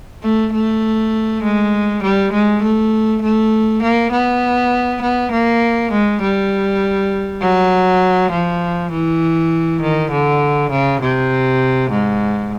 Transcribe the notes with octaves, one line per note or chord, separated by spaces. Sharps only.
A3
A3
G#3
G3
G#3
A3
A3
A#3
B3
B3
A#3
G#3
G3
F#3
F3
E3
D#3
D3
C#3
C3
G#2